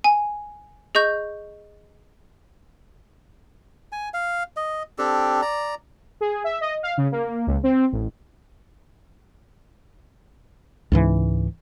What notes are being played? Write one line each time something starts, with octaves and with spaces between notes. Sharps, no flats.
G#5
G#4 D#5 C#6 G6
G#5
F5
D#5
C4 D4 G4 A4
D5 A#5
G#4
E5
D#5
F5
C#3
A#3
C#2
C4
A1
C#2 G#2 E3